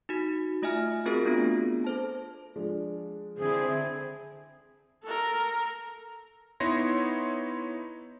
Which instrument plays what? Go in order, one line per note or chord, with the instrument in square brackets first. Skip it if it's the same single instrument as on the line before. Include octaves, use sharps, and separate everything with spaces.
[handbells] D#4 F#4
A3 F4 D#5 E5 G#5 F6
C4 F4 F#4 G#4 A#4
A3 B3 C4 D4 F4 D7
A4 C5 A5
[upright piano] F3 G#3 D4
[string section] D3 C4 E4 [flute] G#4
[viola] A4 A#4
[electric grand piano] B3 D#4 E4 C#5 C6 A#6